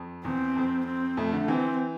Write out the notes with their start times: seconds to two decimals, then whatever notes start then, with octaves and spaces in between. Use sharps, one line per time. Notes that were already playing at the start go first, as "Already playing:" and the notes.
Already playing: F2
0.25 E2 C4
0.56 F2
0.87 C4
1.17 F2 A3
1.33 D3
1.48 E3 C4